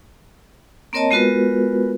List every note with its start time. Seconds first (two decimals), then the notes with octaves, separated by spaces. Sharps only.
0.93 A#3 C4 A#4 C#5 D#5 A5
1.11 G#3 B3 F4 F#4 A#4 B4